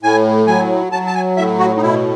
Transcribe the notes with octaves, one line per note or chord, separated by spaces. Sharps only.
A2 G#5
F#3 G#5
F#3 A5
A5
G#5
A2 E5
F#4
D#4
B2 E4